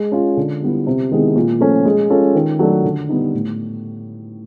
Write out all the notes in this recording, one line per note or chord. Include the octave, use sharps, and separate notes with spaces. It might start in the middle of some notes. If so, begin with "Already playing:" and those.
Already playing: G#3
C#4 F4
D3
G3 B3 E4
C3
D#3 G#3 B3 E4
A#2
F3 A3 C#4
G#3
C#4 F4 A4
D#3
F#3 A3 D4
D3
G3 B3 D#4
A2